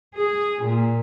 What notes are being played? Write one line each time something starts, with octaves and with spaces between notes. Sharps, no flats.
G#4
A#2